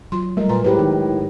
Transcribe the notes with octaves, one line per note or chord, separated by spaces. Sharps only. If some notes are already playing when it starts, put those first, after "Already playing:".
F#3 F4 C6
G3 A3 A#4 D#5
A#2 B4 A#5
A2 G#3 G4 G#4 B4 C5
D#3 D#4 E4